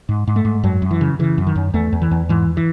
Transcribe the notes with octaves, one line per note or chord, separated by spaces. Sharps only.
G#2
G#2
A3
G#2
F#2 F#3
F#2
E3
C#3
C#3 E3
F#2
D#3
F#2
E2 A3
E2
E3
E2
G#2 E3
E3